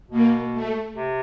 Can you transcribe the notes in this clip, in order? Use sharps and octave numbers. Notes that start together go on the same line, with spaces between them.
B2 A#3
A3
C3